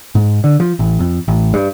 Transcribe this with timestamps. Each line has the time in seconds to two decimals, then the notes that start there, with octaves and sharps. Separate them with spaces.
0.15 G#2
0.44 D3
0.60 F3
0.79 A1
1.00 F2
1.28 A1
1.54 G2